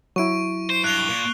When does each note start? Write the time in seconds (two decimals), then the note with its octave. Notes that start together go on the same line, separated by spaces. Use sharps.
0.16 F#3 E4 C#6 D7
0.70 C5 C7
0.84 G2 F#6 F7 G7
1.10 A#2